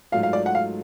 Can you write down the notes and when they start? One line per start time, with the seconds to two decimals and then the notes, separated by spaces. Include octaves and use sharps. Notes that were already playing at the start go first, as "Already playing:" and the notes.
0.12 G#2 F#3 A3 F4 F5
0.23 F5
0.33 D5
0.46 F#5
0.55 F5